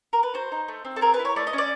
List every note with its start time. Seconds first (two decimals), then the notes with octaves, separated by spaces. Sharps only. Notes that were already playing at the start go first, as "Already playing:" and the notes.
0.13 A#4
0.23 B4
0.34 F#4 C5
0.52 D#4
0.68 A3
0.85 C4
0.96 A4
1.01 G#4 A#4
1.14 B4
1.19 E4
1.25 C#5
1.36 A3 D5
1.47 D#5
1.53 C#4
1.58 D5